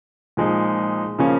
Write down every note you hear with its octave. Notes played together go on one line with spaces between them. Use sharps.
A#2 F3 G#3 D#4
C#3 F3 A#3 C#4